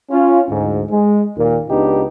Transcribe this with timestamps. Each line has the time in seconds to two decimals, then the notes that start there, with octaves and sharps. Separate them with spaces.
0.10 C#4 F4
0.49 D2 G#2
0.90 G#3
1.36 D#2 A#2
1.69 C#2 B3 D4 D#4 G4